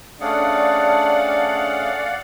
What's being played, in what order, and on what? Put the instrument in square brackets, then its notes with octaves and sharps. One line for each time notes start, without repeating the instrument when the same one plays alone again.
[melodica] A3 C#4 G#4 [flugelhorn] D4 [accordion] D5 F5 F#5